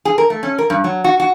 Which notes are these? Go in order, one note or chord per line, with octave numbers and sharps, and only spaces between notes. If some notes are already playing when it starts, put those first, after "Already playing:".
G#4
A#4
A3
C#4
A#4
G2
F#3
F#4
F#4